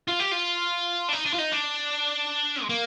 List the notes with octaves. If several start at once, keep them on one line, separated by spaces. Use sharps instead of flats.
F4
G4
F4
D4
D#4
D4
F4
D#4
D4
G#3
A#3